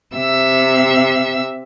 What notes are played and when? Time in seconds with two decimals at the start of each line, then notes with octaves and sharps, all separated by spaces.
0.15 C3 E5 E6